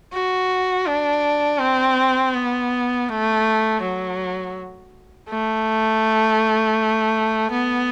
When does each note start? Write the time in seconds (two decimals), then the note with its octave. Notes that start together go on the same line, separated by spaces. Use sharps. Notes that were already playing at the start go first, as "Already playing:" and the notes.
0.13 F#4
0.87 D4
1.60 C4
2.34 B3
3.09 A3
3.82 F#3
5.29 A3
7.51 B3